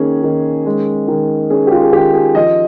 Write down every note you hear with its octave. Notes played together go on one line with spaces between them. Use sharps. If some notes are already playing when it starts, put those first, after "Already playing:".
Already playing: D#3 A#3 C#4 G#4
D#3
G#3
D#3
C#4 G#4
G4
F4
G#4
D#3 G4
G#4
F3 D#5